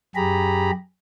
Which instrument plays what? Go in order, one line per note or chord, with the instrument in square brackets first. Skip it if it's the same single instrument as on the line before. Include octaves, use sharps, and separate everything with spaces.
[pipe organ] F#2 G4 G#4 A#5 B5